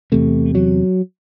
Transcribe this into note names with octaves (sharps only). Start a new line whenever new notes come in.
E2 C3 A3
F#3